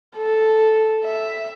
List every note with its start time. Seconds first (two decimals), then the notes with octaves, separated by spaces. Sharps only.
0.17 A4
1.05 E5